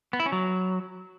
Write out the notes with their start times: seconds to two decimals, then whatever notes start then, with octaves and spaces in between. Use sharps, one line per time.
0.13 B3
0.20 E4
0.26 C#4
0.32 F#3